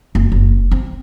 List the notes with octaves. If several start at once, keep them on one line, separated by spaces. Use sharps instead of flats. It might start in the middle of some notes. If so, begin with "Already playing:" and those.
F#1
F#1
C4